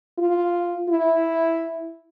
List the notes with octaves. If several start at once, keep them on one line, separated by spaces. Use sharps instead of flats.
F4
E4